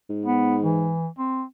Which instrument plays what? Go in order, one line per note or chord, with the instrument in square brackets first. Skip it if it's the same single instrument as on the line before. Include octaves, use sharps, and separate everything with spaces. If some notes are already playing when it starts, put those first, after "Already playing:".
[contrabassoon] G#2
[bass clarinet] B3
E3
C4